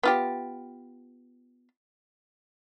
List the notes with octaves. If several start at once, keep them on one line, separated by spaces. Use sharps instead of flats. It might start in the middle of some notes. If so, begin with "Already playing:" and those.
B3 F4 G4